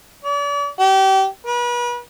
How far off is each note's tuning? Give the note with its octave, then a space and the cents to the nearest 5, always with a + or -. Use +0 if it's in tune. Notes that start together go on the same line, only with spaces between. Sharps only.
D5 -40
G4 -30
B4 -35